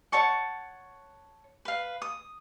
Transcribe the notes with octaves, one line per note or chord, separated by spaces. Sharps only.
C#5 F#5 A5 C#6
B4 F5
D#6